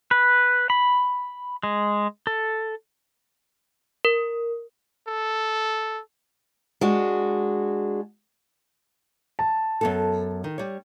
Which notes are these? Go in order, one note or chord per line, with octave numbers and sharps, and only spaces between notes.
B4
B5
G#3
A4
A#4
A4
G#3 D4 F#4
A5
F#2 B3 A4
D#3
G3 C#5